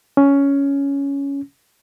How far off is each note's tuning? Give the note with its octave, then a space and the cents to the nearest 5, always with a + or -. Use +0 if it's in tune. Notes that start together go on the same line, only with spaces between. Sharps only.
C#4 +10